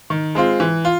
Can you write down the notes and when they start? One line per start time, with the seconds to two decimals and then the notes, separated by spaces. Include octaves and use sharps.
0.10 D#3
0.35 G#3 C4 F4
0.60 E3
0.85 F4